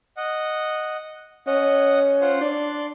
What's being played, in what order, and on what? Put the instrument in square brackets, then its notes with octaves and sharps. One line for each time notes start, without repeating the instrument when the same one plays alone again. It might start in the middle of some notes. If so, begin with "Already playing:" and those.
[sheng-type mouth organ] D#5 F#5
[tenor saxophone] C#4 [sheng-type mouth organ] D#5 F#5
[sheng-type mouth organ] F4 C5 F#5
[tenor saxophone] D4 [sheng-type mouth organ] D5 C6